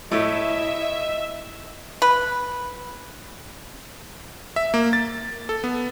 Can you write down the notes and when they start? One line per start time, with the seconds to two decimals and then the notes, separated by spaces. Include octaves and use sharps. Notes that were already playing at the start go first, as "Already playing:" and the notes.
0.11 A2 A3 E4 D#5 E5
2.02 B4
4.56 E5
4.74 A#3
4.93 A6
5.49 A4
5.64 B3